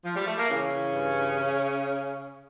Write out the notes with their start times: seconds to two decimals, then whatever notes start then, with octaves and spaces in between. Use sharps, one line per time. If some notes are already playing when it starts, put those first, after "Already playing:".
0.04 F3
0.16 G3
0.27 A3
0.38 A#3
0.50 C#3 E3 C#4
0.71 E3
0.92 G2
1.14 E3